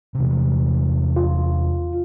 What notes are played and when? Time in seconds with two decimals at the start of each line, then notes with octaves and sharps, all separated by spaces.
0.15 E2 C3
1.16 F4